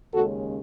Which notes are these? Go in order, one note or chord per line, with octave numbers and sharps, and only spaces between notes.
D#2 C#3 G#3 C#4 F#4 A4